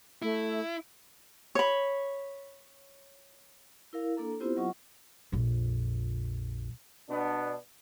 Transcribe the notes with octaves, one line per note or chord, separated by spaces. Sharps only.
A3 E4
C#5 B5
E4 A#4 F5
A#3 D4 A4 A#5
B3 C4 E4 F4 G4 C5
F#3 F4 D#5 F#5 C#6
A#1 F2
B2 B3 D4